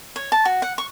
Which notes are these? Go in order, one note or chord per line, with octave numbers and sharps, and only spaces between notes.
C#5
A5
F#4
F#5
C#6